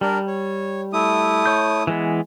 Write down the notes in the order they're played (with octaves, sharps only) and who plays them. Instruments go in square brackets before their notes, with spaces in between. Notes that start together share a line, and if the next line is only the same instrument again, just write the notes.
[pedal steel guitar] G3 [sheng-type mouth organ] D4 A#4
[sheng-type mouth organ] C#5
A3 E4 D#6
[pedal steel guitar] C#5 G6
E3 G#3 B3